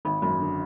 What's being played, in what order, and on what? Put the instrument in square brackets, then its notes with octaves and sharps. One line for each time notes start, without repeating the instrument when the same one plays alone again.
[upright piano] G#1 [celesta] B5
[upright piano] F#2 [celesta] B5
[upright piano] D3